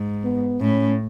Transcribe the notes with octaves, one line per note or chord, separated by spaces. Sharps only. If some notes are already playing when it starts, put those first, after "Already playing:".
Already playing: G#2
B3
A2 C#4